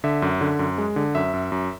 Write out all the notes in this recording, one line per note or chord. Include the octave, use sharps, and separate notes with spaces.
D3 E5
F#2
D3
F#2
G#3
D3
F#2 E5
F#2
F#2